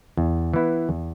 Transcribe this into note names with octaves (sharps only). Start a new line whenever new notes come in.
E2
E3 B3 E4
E2